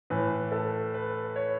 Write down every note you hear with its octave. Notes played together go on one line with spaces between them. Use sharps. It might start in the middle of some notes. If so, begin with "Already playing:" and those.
A2 E3 B4
A4
B4
C#5